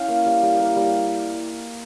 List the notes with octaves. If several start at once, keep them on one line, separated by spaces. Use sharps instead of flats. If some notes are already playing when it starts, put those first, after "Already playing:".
Already playing: C#4 E4 F5 G5
A#3
G3
G3
A#3
G3